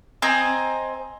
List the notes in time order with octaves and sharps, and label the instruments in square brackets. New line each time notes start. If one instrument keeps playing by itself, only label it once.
[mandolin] C4 D#5 G#5 A#5